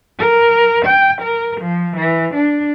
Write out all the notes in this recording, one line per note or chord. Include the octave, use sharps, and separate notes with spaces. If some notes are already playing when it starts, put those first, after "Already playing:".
A#4
G5
A#4
F3
E3
D4